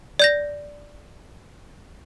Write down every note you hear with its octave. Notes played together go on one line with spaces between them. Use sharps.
D5 G6 A#6